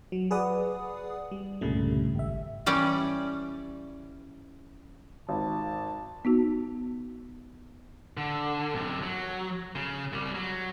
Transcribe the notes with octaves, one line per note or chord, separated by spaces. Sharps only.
F#3
G#4 B4 D5 F#5 D#6
G3
C2 G2 A#2 C#3 G3 A3
G#1 E5
E3 G3 C#4 D5
G#1 A5
B3 D#4 F#4
D3
F#2 C3
F#3
C#3
C2 G3
F#3